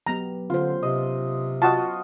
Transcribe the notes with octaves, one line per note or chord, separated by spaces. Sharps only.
F#3 B3 G4 A#5
D3 C#4 F4 C5
C3 D#5
F4 F#4 D#5 A5